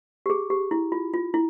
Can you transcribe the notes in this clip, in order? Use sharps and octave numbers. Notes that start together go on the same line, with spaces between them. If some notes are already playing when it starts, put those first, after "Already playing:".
G4
G#4
G4
E4
F4
F4
E4